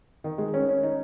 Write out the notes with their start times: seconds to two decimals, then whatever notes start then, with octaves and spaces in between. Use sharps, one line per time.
0.24 D#3
0.38 G#3
0.54 C#4
0.69 C#4
0.83 D#4